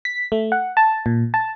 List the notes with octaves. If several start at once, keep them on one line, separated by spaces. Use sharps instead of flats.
B6
A3
F#5
A5
A#2
A5